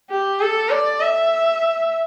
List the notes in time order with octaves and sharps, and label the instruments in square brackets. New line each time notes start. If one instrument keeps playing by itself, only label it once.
[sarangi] G4
A4
D5
E5